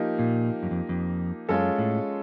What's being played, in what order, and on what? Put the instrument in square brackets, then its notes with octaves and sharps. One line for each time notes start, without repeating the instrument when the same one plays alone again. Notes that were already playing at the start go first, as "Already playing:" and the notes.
Already playing: [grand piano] F3 A#3 D#4 G4
[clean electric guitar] A#2
F#2
F2
F2
[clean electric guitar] F#2 [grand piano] G#3 C#4 F4 A4
[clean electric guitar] A2